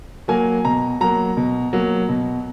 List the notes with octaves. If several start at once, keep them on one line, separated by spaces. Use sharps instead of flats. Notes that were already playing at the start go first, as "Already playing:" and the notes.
F#3 A#3 G#5
B2 A#5
F#3 A#3 A#5
B2
F#3 A#3
B2